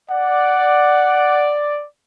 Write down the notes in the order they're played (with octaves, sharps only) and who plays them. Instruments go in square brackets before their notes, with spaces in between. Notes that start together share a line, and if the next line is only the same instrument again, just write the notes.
[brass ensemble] D5 [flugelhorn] F#5